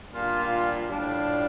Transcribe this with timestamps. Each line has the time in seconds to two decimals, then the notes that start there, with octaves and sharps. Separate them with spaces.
0.14 A#2 G3 D4 F4
0.87 A2 G3 D4 F4